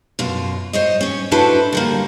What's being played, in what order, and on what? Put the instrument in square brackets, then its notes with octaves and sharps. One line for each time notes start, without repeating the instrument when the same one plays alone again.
[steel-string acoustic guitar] F#2 B2 F4
C5 C#5 D#5
C#4 C#5
D4 E4 F#4 A4 B4 C5
D3 G3 A#3